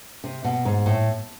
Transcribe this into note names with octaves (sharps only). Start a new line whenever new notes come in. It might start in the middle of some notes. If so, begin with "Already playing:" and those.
C3
B2
G#2
A2